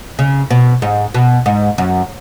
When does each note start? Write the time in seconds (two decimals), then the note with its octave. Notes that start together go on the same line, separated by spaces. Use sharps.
0.19 C#3
0.51 B2
0.82 G#2
1.14 B2
1.46 G#2
1.78 F#2